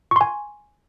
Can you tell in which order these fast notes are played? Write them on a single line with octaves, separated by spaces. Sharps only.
C#6 C6 G#5